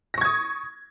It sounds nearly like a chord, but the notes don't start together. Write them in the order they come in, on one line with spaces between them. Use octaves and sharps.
A#6 C#6 G#6 D#6